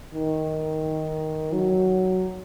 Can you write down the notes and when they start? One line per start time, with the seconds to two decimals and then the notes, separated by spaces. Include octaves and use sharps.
0.14 D#3
1.53 F#3